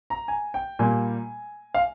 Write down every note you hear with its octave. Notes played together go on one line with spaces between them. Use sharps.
A#5
G#5
G5
A#2 G3 A#3 G#5
F5